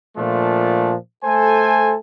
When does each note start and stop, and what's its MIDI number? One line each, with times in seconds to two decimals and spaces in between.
0.17 0.95 46
0.17 0.95 53
0.17 0.95 57
0.17 0.95 62
0.17 0.95 65
1.24 1.95 57
1.24 1.95 69
1.24 1.95 72
1.24 1.95 80